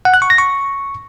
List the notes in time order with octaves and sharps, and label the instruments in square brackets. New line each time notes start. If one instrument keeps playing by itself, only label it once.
[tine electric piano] F#5
F#6
C#6
A#6
C#6